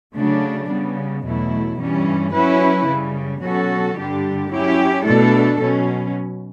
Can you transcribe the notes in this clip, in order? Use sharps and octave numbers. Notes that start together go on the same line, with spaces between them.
C#3 F#3 A3 D4
C#3 G3 B3
E2 B2 F#3 A3 E4
G2 E3 G3 C#4
F#3 C#4 E4 B4
F#2 C#3 G3
B2 F#3 C#4 F#4 A4
G2 D3 G3 D4 G4
F#3 C#4 E4 G4
B2 A3 D4 A4
B2 F#3 C#4